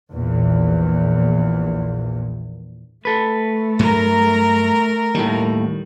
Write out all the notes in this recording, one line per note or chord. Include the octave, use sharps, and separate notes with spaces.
A#1 E2 A#2
A3 A4 B4
G2 F#3 B3 A#4 A#5
D#2 A2 D#3 G3